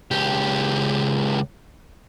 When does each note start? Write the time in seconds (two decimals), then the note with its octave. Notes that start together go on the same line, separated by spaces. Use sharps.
0.11 C#2 G4